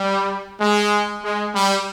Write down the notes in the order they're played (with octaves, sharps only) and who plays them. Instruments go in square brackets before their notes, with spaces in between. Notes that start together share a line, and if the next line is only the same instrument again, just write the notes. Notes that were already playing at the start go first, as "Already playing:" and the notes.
Already playing: [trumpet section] G3
G#3
G#3
G3